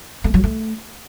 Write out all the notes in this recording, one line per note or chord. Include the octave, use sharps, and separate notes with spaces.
A3
F#3
A3